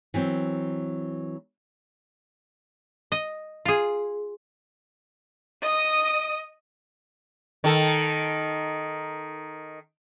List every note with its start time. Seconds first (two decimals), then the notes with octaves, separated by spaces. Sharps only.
0.14 E3 F#3 C4
3.12 D#5
3.65 F4 G#4
5.62 D#5 D#6
7.64 D#3 A4